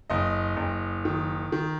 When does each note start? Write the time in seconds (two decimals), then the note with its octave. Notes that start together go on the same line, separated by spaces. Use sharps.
0.10 F#1 D#5
0.57 F#1
1.05 D#3
1.52 D#3